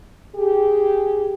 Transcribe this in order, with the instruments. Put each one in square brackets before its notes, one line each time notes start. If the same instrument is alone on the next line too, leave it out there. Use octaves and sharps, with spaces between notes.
[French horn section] G4 G#4